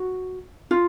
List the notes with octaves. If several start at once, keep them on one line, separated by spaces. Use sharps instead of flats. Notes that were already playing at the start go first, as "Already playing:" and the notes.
Already playing: F#4
F4